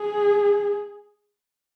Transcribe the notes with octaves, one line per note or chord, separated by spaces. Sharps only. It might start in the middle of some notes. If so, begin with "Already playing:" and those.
Already playing: G#4